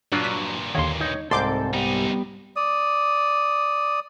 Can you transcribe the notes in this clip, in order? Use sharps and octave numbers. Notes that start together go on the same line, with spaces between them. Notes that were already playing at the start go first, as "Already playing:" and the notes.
G2 A#2 F#3 D4 F4 F#6
B6
D#2 D3 D#3 C#5 F5 C6
D#4 C#5
C2 G#2 C4 A4 G5 C6 D6 G6
C3 G3 B3 D#4 G4
D5 D#6